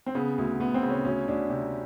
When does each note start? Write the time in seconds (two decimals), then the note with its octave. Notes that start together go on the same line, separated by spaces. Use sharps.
0.06 C4
0.15 C#3 B3
0.38 D2
0.59 D2 B3
0.74 C4
0.83 C#3
0.89 C#4
1.05 D2 C#4
1.28 D2 D4
1.50 C3